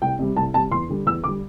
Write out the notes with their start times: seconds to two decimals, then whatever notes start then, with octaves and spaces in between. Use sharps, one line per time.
0.02 C2 G5
0.19 C3 G3
0.36 C2 A5
0.54 C3 G3 A5
0.71 E2 C6
0.89 D3 G3
1.06 E2 E6
1.24 D3 G3 D6